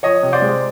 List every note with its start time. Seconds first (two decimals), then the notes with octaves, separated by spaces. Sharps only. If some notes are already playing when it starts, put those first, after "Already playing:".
0.03 F3 C#5 D#5
0.23 C3
0.33 C5 D5
0.42 G#3